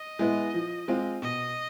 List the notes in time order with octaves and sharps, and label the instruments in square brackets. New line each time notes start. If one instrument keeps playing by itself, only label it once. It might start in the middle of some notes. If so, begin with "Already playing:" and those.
Already playing: [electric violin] D#5
[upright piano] G#3 B3 E4
F3
G#3 C4 F4
[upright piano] B2 [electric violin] D#5